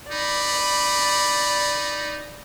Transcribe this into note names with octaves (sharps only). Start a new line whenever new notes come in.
D#4 D5 B5